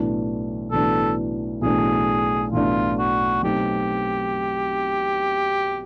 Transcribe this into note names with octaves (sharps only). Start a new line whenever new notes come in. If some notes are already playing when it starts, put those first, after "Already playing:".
Already playing: B1 A2 E3 A3 D4
B1 A2 E3 A3 D4 A4
B1 A2 E3 A3 D4 G#4
B1 A2 E3 A3 D4 F4
F#4
B2 F#3 A3 C4 D#4 G4